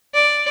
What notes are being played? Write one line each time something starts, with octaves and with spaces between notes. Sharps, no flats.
D5